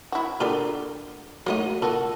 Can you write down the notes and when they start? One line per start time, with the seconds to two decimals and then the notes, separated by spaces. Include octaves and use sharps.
0.12 E4 F#4
0.40 A#2 D3 G4 A#4 D5
1.47 F#3 A3 A#3 D#4
1.82 A#2 F#4 A4